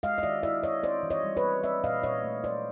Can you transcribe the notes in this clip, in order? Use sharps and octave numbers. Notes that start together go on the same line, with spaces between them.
G#3 D#5 F5
D#5
D#3 D5 E5
E4 D5 E5
G#3 C#5 D#5
C4 C5 D5
E3
C#5 D#5
G3
B4 C#5
C4
C4 D5 E5
A#2 D#5 F5
A#2 C#5 D#5
A3
F#3 C5 D5